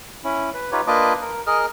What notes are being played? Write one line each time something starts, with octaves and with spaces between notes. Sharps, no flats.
C#4 E4
B4
D#4 F4 G4 B4 C#5
A#3 D4 F4 B4 D#5 D6
A#4
G#4 A#4 D#5 F6